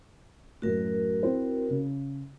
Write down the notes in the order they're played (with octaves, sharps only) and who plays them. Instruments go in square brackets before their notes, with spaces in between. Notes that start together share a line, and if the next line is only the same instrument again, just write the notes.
[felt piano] F#2 A2 [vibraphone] F#4 A#4
[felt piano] C4 E4 C5
C#3